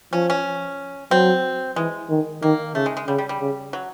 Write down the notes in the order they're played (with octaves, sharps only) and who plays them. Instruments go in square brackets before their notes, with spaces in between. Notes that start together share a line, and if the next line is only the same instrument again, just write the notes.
[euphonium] F3 [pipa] C#4
[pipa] C#4
[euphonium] F#3 [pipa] C4
[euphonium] E3 [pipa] G#3
[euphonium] D#3
[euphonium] D#3 [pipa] A#3
[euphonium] C#3 [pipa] A3
[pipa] G#3
G#3
[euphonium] C#3 [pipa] G3
[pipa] G3
G3
[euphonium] C#3
[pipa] F#3